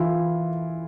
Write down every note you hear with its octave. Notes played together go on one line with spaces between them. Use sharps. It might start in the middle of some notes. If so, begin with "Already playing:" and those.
Already playing: E3 E4 F4